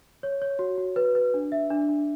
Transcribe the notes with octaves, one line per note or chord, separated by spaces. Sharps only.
C#5
C#5
F#4
F#4
B4
B4
D4
E5
D4
D4